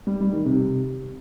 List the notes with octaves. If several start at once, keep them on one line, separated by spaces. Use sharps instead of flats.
G3
G3
D#3
C3